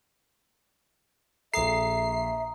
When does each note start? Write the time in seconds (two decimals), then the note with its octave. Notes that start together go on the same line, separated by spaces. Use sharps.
1.54 A#1 A4 E5 A#5 D#6 C7